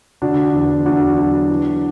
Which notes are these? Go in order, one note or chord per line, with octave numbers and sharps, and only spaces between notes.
D3 D4 F#4
E2
E2 D4 F#4
F#3
E3